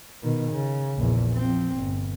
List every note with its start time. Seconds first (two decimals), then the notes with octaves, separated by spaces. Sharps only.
0.22 B2 D#3
0.51 C#3
0.96 A#1 E2
1.34 F3 C4
1.76 G1